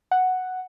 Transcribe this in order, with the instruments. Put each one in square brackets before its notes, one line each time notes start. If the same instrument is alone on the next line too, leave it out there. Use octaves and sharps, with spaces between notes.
[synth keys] F#5